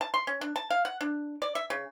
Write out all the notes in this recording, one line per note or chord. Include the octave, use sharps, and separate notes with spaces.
A5
C6
C#4
D4
A5
F5
F#5
D4
D5
E5
C#3